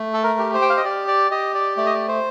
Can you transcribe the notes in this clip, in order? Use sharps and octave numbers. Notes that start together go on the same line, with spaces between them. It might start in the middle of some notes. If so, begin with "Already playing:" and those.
Already playing: A3
A4
A#4
G4
C5
G5
F5
D#5
G4 D5
D5
G4 D#5
D5
A3 D5
D#5
D5
C5